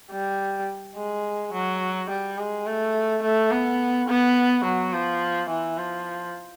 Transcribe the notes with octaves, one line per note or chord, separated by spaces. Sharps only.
G3
G#3
F#3
G3
G#3
A3
A3
B3
B3
F#3
F3
E3
F3